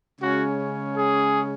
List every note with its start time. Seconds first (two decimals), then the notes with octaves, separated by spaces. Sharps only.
0.20 C#3 G#3 C#4 F#4
0.96 G#4